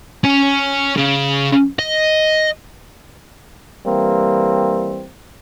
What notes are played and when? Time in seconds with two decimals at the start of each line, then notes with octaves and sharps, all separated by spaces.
0.24 C#4
0.97 C#3
1.79 D#5
3.86 E3 G3 A#3 C4